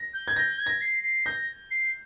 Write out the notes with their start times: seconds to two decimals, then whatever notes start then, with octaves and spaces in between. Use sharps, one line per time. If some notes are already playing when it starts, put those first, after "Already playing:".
Already playing: A#6
0.14 G6
0.28 G#6
0.36 G6 A#6
0.59 G#6
0.66 A#6
0.81 C7
1.04 C7
1.26 G6 A#6
1.71 C7